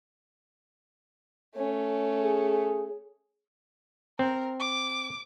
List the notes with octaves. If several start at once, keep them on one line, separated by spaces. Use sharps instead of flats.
A3 C#4
G#4
C4 A#4
D6